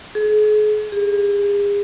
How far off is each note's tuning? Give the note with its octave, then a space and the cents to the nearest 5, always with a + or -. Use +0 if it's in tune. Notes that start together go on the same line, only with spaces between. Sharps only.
G#4 +40
G#4 -40